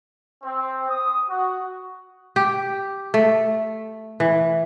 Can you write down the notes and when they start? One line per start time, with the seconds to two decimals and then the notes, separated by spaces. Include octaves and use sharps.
0.43 C4
0.89 D#6
1.29 F#4
2.36 G4
3.14 A3
4.20 E3